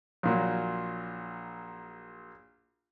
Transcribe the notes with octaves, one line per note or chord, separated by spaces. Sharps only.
A#1 A#2 F#3